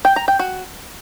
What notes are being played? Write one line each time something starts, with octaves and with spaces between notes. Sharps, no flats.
G5
A#5
G5
F#4